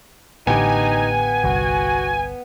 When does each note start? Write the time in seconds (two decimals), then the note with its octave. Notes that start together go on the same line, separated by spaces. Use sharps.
0.47 A1 A2 D3 B3 D#4 G4 G#5
1.44 G1 C2 F#4